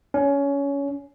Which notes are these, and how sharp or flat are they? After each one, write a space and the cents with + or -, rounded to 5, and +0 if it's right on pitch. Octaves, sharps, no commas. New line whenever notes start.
C#4 +20